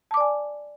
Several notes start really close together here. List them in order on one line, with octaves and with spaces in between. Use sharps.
A5 D6 D5 G#5